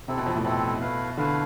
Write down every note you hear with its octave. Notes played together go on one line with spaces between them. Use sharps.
C3 C4 E4 A4
B2
F2
A2
B2 C4 E4 A4
A3 E4 B4 F5
D3 A3 E4 B4 F5